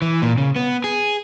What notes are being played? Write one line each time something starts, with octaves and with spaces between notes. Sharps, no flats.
E3
A#2
C#3
B3
G#4